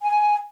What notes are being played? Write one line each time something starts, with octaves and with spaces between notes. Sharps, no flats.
G#5